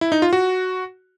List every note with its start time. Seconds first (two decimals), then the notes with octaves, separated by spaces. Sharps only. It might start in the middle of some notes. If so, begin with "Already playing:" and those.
0.01 E4
0.12 D#4
0.22 F4
0.33 F#4